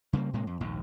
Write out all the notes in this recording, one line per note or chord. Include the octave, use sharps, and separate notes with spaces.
C#3 G3 G#3 A#3
A2 C3 G#3 A#3
F2
A#1 D#2 G#2